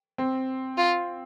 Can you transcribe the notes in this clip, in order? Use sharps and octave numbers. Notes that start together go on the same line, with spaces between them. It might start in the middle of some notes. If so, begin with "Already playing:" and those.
C4
F4